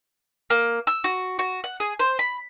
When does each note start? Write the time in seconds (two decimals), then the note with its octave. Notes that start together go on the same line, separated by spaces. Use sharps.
0.50 A#3
0.87 E6
1.04 F#4
1.39 F#4
1.64 F#5
1.80 G#4
1.99 C5
2.19 B5